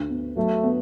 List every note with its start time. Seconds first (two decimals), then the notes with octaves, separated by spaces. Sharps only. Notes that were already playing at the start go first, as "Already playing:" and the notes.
Already playing: D2
0.10 B3
0.36 F#3 A3
0.63 B3